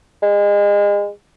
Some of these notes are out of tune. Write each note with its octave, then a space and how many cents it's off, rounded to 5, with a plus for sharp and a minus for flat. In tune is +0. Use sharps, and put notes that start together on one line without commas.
G#3 -30